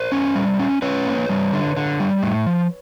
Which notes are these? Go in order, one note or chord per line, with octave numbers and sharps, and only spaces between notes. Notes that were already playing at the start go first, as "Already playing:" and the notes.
Already playing: A#4 C5
C#4
G3
C#4
C#4 B4 C#5
A#3
G3
D3
D3
G3
A2
F3